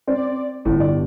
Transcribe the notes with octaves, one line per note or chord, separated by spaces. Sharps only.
C4 D5
G1 A2
D5